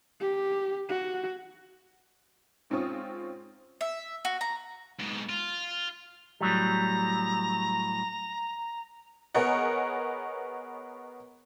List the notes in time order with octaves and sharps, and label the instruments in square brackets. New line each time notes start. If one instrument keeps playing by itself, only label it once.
[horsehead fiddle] G4
F#4
[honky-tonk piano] G#2 C4 C#4 F4 C#6 D#6
[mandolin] E5
F#4
A#5
[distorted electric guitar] G#2 B2
F4
[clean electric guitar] A2 F#3 G3 [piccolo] A#5
[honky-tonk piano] B3 G#4 A#4 C#5 D#5 F#5